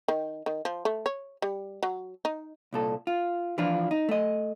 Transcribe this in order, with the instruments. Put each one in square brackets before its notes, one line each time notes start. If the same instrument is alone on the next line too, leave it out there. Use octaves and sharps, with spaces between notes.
[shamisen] D#3
D#3
F3
A3
C#5
G3
F#3
D#4
[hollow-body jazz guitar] C2 A#2 A4
F4
E3 F3 D4 E4 F4
D#4
A3 D#5